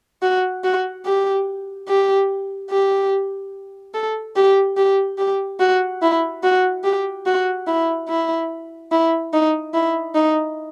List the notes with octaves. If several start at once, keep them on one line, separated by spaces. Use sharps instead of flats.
F#4
F#4
G4
G4
G4
A4
G4
G4
G4
F#4
E4
F#4
G4
F#4
E4
E4
E4
D#4
E4
D#4